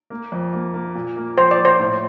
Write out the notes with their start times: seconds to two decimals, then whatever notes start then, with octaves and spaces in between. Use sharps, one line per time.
0.10 A#3
0.32 F2
0.53 A#3
0.74 A#3
0.95 A#2
1.16 A#3
1.38 F3 C5
1.51 D5
1.59 F3
1.65 C5
1.79 A2